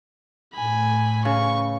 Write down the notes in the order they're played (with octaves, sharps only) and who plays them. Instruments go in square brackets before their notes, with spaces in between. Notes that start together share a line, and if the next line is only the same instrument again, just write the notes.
[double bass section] A2 A3 [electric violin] G#5 B5
[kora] C#3 B4 [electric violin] C#6